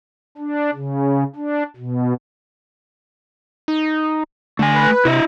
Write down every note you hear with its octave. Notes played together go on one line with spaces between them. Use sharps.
D4
C#3
D4
B2
D#4
D3 A3 G#5
B4
C3 E4 D#5 E5